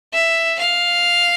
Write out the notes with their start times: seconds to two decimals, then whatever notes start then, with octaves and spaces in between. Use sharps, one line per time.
0.13 E5
0.59 F5